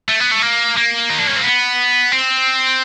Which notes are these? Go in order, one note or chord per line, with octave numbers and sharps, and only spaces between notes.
A3
B3
A3
A#3
A#3
D#4
D4
C#4
C4
B3
C4